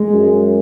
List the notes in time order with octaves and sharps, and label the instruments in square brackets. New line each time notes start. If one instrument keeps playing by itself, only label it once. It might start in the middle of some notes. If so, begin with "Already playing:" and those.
Already playing: [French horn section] G#3
[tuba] F#2